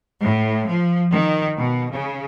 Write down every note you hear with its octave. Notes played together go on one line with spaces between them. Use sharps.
A2
F3
D#3
B2
C#3